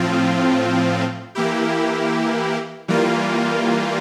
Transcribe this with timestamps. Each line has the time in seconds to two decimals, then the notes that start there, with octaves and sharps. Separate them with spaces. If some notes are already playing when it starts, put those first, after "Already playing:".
Already playing: A2 F3 C4 F4
1.35 E3 A#3 E4 G4
2.88 E3 G3 A#3 F4